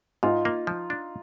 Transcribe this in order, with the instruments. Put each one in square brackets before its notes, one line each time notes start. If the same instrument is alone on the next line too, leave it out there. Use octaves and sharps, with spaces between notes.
[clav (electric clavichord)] G#2 [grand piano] D#4 F4
[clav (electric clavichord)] A#3
F3
D4